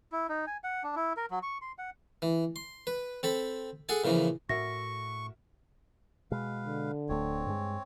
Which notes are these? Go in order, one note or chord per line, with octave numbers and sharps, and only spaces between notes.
E4
D#4
G#5
F#5
D4
E4
A#4
F#3
C#6
C6
F#5
E3
C6
B4
C4 A4 B5
G#4 A4 F#5 G#5
A#2 C#3 E3 F3
A2 F#4 A#4 E5 C#6 A#6
B2 G#3 B4 F5
D3
D1 A3 C4 C#5
G2 G#3